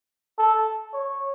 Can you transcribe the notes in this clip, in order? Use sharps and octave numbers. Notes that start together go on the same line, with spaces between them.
A4
C#5